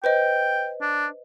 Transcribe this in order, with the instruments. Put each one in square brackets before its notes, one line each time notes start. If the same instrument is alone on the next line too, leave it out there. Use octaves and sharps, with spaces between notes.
[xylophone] B4 C5 D#5 [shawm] G5
[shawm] D4